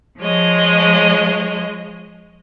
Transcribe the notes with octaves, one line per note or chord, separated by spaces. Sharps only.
F3 G#3 C#5 D#5